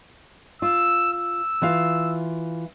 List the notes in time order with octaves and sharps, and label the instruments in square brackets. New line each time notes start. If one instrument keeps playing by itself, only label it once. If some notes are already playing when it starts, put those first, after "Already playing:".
[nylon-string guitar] F4 [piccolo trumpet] E6
[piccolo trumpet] E6
[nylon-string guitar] E3 F4 F5